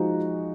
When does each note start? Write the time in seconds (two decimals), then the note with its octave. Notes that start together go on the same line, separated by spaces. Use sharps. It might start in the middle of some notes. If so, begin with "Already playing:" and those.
Already playing: F3 G#3 D#4 F#4